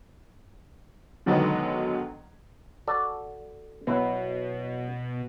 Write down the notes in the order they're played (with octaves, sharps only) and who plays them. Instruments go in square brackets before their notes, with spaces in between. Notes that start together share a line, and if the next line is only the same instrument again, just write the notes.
[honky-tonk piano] B2 D3 D#3 F#3 G#3 B3
[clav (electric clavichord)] F#4 A4 D5
[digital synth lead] B2 [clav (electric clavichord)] F#3 E4 B4